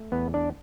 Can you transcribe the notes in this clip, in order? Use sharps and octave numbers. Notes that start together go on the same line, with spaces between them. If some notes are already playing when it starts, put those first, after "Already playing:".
Already playing: A3
E2 B3 B4
D4 D5